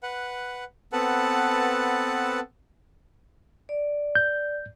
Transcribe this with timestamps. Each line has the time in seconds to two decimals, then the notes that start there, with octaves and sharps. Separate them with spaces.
0.03 B4 F#5
0.93 B3 C4 A4 B4 F#5 A5
3.69 D5
4.15 G6